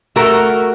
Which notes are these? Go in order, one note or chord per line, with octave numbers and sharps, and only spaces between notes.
A3 F#4 A#4